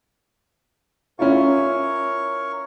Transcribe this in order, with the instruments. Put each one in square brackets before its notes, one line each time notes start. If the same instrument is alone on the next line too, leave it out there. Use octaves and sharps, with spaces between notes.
[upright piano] C#4 E4 F4 [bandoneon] A#4 C#5 C#6